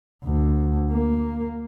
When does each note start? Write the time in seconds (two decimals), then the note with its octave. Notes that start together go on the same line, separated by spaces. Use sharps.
0.24 D2
0.91 A#3